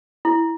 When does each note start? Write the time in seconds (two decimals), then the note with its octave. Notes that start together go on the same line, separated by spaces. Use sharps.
0.25 E4